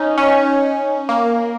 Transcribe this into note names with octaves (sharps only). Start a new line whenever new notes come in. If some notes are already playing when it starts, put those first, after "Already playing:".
Already playing: C#4 D#4
C#4
A#3